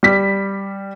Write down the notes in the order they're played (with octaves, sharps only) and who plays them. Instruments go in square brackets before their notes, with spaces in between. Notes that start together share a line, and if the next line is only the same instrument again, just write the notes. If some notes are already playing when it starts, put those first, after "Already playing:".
[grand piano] G3 B6